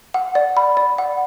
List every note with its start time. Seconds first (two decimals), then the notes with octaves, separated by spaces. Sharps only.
0.14 F#5
0.35 D5
0.57 B5
0.77 D5
0.98 F#5